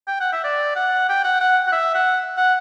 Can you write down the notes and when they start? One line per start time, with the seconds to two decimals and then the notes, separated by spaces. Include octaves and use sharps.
0.08 G5
0.20 F#5
0.32 E5
0.44 D5
0.75 F#5
1.09 G5
1.24 F#5
1.41 F#5
1.67 F#5
1.72 E5
1.95 F#5
2.37 F#5